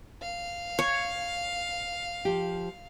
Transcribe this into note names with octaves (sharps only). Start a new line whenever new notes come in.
F5
C#5
F3 G4